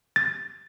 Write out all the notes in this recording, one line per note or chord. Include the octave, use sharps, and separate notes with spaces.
A6